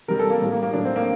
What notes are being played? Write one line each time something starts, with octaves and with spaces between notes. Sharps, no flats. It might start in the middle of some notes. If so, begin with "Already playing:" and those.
C3 G3 A#4
A4
A#3
A2 G3
A#3
A#3
A2 F#3 D4
C4
A#3